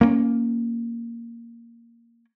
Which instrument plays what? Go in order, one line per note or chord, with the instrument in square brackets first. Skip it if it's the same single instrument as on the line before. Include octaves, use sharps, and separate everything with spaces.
[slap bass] A#3 C4 C#4